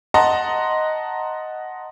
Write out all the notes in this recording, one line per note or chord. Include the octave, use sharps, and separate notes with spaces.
D#5 F#5 A5 A#5 C6